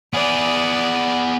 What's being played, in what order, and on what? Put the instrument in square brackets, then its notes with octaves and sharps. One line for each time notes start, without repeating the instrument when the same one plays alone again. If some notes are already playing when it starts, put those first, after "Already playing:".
[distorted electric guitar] B3 G#4 [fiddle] D5